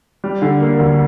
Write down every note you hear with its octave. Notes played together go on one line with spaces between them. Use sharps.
G3
D3
A#3
D2